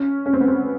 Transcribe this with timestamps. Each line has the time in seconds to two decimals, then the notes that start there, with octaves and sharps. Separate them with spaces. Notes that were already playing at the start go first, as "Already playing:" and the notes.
Already playing: C#4
0.26 C#4
0.33 C4
0.40 B3
0.48 C4